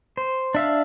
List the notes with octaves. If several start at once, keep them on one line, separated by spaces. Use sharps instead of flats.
C5
D4 E5 F5